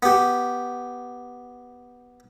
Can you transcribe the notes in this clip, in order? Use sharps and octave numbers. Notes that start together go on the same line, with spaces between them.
B3 G4